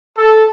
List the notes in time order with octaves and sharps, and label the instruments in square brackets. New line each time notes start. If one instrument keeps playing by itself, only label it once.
[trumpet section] A4